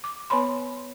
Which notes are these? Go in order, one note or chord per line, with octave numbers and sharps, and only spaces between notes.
D6
B3 B4 C#5 B5 C6